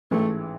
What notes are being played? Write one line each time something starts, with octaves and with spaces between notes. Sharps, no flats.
A1 G#2 E3 A3